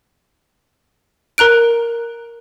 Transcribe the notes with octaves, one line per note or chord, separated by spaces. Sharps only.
A#4 A#5 F#6 D7